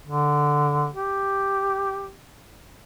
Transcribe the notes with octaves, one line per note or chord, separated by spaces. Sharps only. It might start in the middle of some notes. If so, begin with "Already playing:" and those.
D3
G4